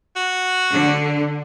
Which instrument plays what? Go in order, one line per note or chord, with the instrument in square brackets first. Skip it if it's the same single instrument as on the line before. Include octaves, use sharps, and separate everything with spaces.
[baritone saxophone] F#4
[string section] D3